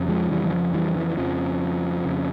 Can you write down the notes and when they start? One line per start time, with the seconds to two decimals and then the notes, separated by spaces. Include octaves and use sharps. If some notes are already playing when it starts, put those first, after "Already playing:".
Already playing: F2 C#3
0.09 F3 G#3
0.30 F2 C#3 E3 G3
0.45 E3
0.53 F3
0.74 E3 G3
0.96 E3
1.17 F2 C#3 F3
2.04 F2 C#3